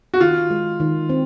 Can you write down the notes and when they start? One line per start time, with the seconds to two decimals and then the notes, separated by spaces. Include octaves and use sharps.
0.14 F#4
0.21 D#3 F4
0.51 G#3
0.80 D#3
1.09 C4